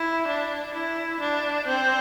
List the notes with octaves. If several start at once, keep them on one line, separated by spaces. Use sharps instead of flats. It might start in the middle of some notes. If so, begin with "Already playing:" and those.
Already playing: E4
D4
E4
D4
C4